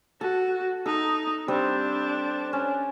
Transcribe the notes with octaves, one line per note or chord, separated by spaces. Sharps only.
F#4 A4 A5
D#4 A4
G3 C4 D4 C5
C#4